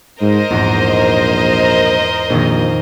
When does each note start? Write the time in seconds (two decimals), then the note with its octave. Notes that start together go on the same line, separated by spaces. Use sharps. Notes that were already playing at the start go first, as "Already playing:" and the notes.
0.21 G#2 A#4 C5 D#5
0.51 A#1 E2 G#2
2.30 A#1 F2 A#2 D#3